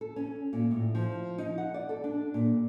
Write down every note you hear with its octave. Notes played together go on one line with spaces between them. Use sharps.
A4
C#4
A#2
A2
F3
D#4
F#5
D5
A4
D4
A#2